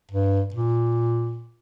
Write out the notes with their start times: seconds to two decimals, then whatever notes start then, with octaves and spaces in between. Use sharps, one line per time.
0.12 G2
0.54 A#2